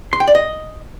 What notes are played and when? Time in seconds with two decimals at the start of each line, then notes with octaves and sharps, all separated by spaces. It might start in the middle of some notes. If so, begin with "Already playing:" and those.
0.13 C6
0.20 G5
0.27 D5
0.35 D#5